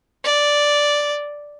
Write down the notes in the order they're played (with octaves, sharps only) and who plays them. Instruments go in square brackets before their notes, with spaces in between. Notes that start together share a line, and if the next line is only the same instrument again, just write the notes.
[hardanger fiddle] D5